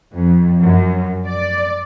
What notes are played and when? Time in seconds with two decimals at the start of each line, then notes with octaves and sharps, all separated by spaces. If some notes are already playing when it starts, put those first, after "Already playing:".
0.13 F2
0.62 F#2
1.26 D5